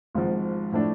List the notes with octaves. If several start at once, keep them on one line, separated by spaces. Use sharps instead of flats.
G#1 G#2 F3
A2 F3 A3 D4